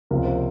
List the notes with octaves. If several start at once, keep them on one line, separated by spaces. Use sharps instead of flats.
C#2 C3 F3 A#3 A#4
C5